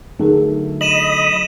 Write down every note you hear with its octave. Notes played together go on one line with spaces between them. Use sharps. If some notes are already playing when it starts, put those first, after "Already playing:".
D3 F#3 A3 D#4 G#4 A#4
D#5 B5 D#6 D#7 E7 F#7